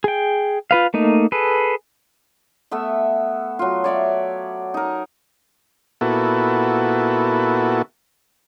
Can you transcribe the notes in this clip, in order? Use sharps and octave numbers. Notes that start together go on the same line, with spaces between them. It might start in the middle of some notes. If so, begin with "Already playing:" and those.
G#4 G5
F4 B4 F5
A3 A#3 D#4
G#4 A4 B4
A3 B3 E5
F#3 F4
C#5 D5 E5 C#6
D#4 A#4
A#2 B3 E4 F#4 A4